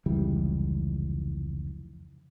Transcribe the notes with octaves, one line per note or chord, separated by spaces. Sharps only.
F1 C#2 E3 G3